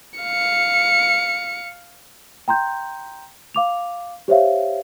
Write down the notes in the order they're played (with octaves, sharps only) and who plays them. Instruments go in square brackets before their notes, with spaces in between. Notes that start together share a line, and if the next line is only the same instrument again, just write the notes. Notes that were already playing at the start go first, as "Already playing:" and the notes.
[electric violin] F5 C#7
[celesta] G5 A#5 C6 G6
F5 D6 F7
G4 C5 C#5 E5 F5